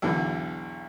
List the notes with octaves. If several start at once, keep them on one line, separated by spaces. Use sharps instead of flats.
B1 E2 D3 E3